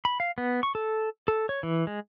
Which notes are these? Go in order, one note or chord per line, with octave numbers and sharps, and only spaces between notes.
B5
F5
B3
C#6
A4
A4
C#5
E3
G#3